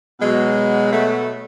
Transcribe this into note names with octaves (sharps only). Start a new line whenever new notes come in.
B2 F#3 G#3
A3